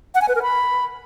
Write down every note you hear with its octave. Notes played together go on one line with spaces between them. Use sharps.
F#5
G#5
B4
A#4
B5